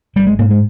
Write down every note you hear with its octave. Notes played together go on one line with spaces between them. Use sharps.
G#1 G3
G#3
G#2 A#3
G#3